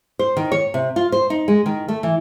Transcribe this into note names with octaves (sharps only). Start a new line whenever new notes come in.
C5
D#3
C#5
C3
F4
C5
D#4
G#3
D#3
A3
E3